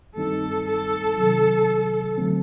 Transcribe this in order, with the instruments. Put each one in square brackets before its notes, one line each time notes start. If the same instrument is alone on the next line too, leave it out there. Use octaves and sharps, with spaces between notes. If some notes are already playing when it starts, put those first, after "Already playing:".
[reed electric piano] G2 D#3 G3 C4 D#4 [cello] A4
[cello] A4
[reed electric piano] C3 D#3 F#3
D3 F#3 A3 C4